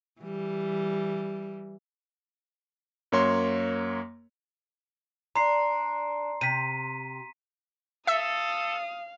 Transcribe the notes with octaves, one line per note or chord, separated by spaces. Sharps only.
E3 G3
F#2 A#3 C#5 C6
D4 A#5 C6 C7
C3 B6 D#7
A4 E5 F5 D#6 E6